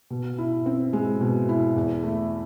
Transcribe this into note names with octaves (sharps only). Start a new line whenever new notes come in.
B2
E4
C4
G#3
B2
E4
E2
A3